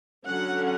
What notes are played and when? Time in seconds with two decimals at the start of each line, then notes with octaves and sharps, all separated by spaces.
0.25 D3 F#3 C#4 F#5